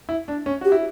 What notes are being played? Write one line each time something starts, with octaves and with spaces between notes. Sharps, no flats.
E4
D4
C#4
F#4 G4
E4